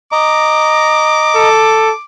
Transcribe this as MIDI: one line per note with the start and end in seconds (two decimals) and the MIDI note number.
0.12 1.49 75
0.12 1.49 82
0.12 2.05 86
1.35 1.92 69